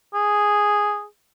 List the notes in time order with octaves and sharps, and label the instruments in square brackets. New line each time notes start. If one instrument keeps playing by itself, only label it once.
[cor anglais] G#4